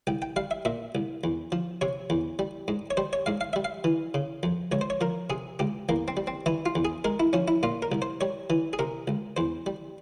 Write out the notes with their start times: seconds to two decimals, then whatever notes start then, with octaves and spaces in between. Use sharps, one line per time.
0.07 C2 G5
0.22 G5
0.36 G3 F5
0.51 E5
0.65 A#2 E5
0.95 C2
1.24 E2
1.52 F3
1.81 C3 C#5
2.10 E2
2.39 G3
2.68 G#2
2.90 C#5
2.97 G3 C5
3.13 C#5
3.26 G#2 F5
3.41 F5
3.53 G3 E5
3.64 F5
3.84 E3
4.14 C#3
4.43 F2
4.72 C#2 C#5
4.81 C5
4.90 C#5
5.01 F3 A#4
5.30 C3 G#4
5.59 C#2 G4
5.89 E2 A#3
6.08 C4
6.17 G3
6.27 C4
6.46 E3 E4
6.66 F4
6.75 E2
6.85 G#4
7.04 G#3 A#4
7.20 E4
7.33 F3 C#4
7.48 E4
7.63 A#2 F4
7.82 A#4
7.92 C2
8.02 C5
8.21 G3 C#5
8.50 E3
8.73 G#4
8.79 C3 A#4
9.08 C#2
9.37 E2 C5
9.66 G3